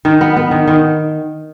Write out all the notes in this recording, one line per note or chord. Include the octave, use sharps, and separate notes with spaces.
D#3
B3
B3
D#3
D#3